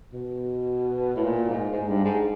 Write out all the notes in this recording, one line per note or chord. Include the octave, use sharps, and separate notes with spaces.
B2
A2
A#2
G#2
G#2
G2
G#2